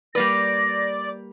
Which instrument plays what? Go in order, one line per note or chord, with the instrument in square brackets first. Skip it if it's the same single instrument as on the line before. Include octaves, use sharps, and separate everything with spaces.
[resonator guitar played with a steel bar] G3 A#3 B4 [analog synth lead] D5 [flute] A#6